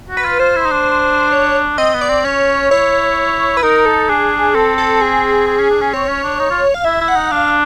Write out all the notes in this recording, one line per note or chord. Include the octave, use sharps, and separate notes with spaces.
F#4
B4
F4
F4 C5
E4
D#4
D4
C#5
C4 D#5
B3
D5
C4
C#4 C#5
E4 C#5
B4
D#4 A#4
A4
D4 G#4
C4 A4
A4
G#4
C4
C#4
D4
C#4
C4 C#5
C#4
D4
D#4
F4
F5
E4 E5
E4
F#5
D#4
D4 F5